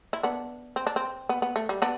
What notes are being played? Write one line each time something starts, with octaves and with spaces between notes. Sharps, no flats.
E4
B3 D4
C4
D4
C4
B3
B3
A3
G3
B3 D4